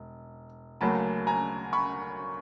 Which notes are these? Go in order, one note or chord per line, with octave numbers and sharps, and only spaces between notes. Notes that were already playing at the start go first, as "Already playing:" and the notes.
Already playing: E1
D2 C#3 F#3 A#3 A5 B5
G#5 A#5
B5 C#6